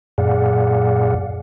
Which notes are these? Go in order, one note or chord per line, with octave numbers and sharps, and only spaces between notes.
F#2 A#2 G#4 D5 F5 F#5